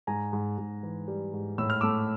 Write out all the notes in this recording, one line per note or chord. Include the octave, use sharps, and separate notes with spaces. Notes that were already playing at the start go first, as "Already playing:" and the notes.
G#2 G#5 A#5
G#2
G#2
E3
G3
G#2
A2 E6
F6
A3 D6 E6